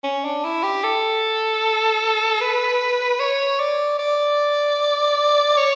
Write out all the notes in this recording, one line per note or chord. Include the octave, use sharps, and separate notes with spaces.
C#4
D4
E4
G4
A4
B4
C#5
D5
D5
C#5